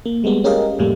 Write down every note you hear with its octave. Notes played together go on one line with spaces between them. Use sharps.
A#3
G3 G#3 A#3 B3
C#4 G4 G#4 A#4 D#5 F5
F2 A2 G3 A3 A#3